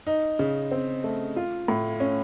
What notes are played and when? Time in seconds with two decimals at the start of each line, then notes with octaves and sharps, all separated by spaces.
0.07 D#4
0.39 C#3
0.71 C4
1.04 A3
1.36 F4
1.68 A2
2.00 C#4